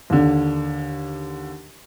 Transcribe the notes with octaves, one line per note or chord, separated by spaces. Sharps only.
D#2 D3